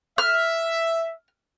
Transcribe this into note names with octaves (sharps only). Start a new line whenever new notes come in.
E5 F6